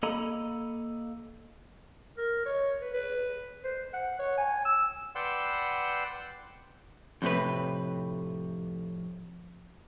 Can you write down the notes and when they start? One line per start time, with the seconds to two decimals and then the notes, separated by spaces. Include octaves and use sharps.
0.03 A#3 A4 D#5 A#5 B5
2.17 A#4
2.46 C#5
2.82 B4
2.94 B4
3.64 C5
3.94 F#5
4.19 C#5
4.38 G#5
4.65 E6
5.15 B4 D5 F#5 G5 C6 E6
7.22 F2 A2 C3 B4